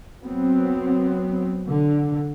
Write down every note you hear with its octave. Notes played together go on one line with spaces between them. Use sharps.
F#3 B3 C4
D3